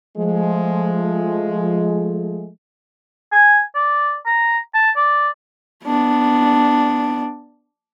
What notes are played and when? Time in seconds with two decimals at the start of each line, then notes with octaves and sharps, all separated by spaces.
0.17 F3 G#3 A3
3.32 G#5
3.75 D5
4.26 A#5
4.74 A5
4.96 D5
5.84 B3 D4